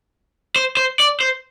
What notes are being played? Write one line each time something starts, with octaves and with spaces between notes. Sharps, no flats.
C5
C5
D5
C5